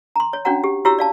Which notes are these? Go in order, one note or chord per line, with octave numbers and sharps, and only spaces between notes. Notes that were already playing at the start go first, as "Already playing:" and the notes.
A#5 C6
C#5
C#4 D4 F#4 C#5 F#5 A#5
G4
E4 F#4 G4 C#5 A#5 E6
D5 F5 A5